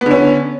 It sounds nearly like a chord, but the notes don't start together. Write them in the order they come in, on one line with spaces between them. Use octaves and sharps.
B3 D3 C#4